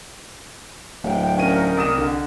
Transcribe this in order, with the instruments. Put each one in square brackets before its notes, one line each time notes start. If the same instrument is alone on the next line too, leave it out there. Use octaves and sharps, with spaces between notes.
[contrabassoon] D1 [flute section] G5
[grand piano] C#4 D#7 [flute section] D#4 A#4
[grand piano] C2 D#6 E7
D3